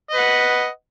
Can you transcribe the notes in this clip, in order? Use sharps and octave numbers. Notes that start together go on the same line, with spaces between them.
B4 D#5 F#5